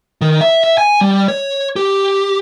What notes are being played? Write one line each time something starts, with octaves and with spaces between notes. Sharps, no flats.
D#3
E5
E5
G#5
G3
C#5
G4